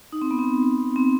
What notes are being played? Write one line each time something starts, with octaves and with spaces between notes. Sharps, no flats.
D#4
C4
B3
C4
C4